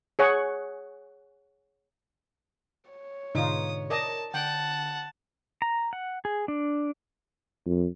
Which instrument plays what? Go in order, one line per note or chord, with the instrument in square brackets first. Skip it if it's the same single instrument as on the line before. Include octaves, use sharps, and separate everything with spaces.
[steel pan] G#4 C#5 F#5
[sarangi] C#5
[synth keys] G#2 B2 D3 [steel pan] D#4 F4 [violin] D#6
[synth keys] A#4 [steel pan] D5 D#5 [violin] A5
[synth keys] D3 [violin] F#5 [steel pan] G5 [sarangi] A5
[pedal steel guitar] A#5
F#5
G#4
D4
[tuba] F2